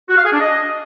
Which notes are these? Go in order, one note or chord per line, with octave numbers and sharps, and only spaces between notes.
F#4
F5
G#4
D4
D#5